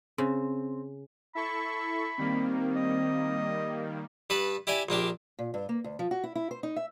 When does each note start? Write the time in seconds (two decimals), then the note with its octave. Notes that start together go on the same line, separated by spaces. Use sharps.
0.18 C#3 C4
1.35 E4 A4 B5 C#6
2.19 D#3 G3 A#3 C4
2.76 D#5
4.30 G2 B4 A5 B5
4.67 E4 G4 D5 E5 G#5
4.89 A#1 A#3 D4 G4
5.39 A#2
5.54 G2
5.69 A#3
5.84 D2
5.99 F3
6.11 F#4
6.24 E4
6.35 E4
6.51 C5
6.63 D#4
6.76 E5